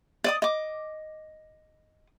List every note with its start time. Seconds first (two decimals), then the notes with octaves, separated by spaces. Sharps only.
0.24 D5 D#5 D#6
0.42 D#5 D6